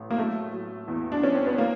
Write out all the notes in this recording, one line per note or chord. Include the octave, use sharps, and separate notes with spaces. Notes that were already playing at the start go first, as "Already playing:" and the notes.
Already playing: A1
A#3
F#3 A3
F#3
E2
D4
E2 C#4
C4
B3
A#3